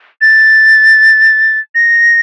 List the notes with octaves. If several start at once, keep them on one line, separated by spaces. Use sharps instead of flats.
A6
A#6